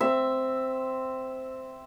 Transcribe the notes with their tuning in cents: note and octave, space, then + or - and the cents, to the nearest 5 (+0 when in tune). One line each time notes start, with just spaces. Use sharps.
C4 -5 E5 +0